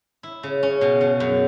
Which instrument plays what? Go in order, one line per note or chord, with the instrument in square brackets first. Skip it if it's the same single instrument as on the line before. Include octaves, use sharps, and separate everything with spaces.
[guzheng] E4
C#3
C#4
B2
C#3
F#2